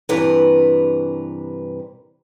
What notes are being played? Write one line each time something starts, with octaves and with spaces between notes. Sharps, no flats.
G2 C3 E3 A#4 B4